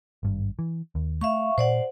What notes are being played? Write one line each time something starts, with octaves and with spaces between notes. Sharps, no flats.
G#1 G2
E3
D#2
A3 E5 F5 C#6
A#2 C5 D5 F#5